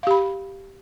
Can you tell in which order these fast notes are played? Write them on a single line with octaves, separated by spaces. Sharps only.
F5 G4 B5